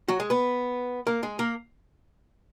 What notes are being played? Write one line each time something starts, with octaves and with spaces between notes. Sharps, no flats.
F#3 F#4
G#3 G#4
B3 B4
A#3 A#4
G#3 G#4
A#3 A#4